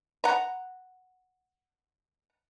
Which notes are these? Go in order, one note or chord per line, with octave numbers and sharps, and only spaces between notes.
F#5 A#5